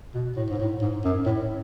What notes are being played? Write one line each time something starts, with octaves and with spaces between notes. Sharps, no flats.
B2
A2
G#2
A2
G#2
F#2
A2